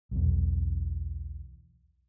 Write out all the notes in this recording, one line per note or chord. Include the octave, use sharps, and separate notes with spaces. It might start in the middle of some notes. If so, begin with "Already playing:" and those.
B1 E2